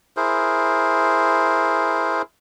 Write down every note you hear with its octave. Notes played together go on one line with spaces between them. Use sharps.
E4 G#4 A#4 C5